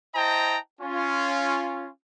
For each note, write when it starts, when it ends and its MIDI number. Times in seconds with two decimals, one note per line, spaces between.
0.15 0.58 64
0.15 0.58 72
0.15 0.58 75
0.15 0.58 79
0.15 0.58 81
0.15 0.58 82
0.81 1.89 61
0.81 1.89 65